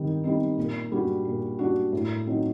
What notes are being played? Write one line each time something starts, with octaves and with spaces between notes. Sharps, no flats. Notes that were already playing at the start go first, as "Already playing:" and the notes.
Already playing: D#3 G3 C4 D#4
G3 C4 D#4
A#2
G3 D4 F#4
A#2
G3 D4 F#4
A2
F#3 C4 D#4